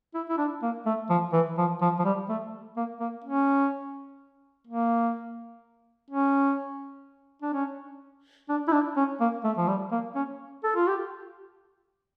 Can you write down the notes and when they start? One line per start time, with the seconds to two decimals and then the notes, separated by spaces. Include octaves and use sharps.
0.14 E4
0.29 E4
0.37 D4
0.62 A#3
0.85 A3
1.10 F3
1.33 E3
1.58 F3
1.81 F3
1.99 F3
2.05 G3
2.29 A3
2.76 A#3
3.00 A#3
3.24 C#4
4.67 A#3
6.10 C#4
7.42 D4
7.53 C#4
8.49 D4
8.68 E4
8.72 D4
8.96 C#4
9.20 A#3
9.44 A3
9.57 F3
9.67 G3
9.91 A#3
10.15 C#4
10.63 A4
10.75 F4
10.87 G4